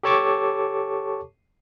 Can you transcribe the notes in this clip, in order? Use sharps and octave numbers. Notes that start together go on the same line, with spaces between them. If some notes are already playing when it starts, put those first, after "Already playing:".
G4 A4 C#5 A5 C#6 D6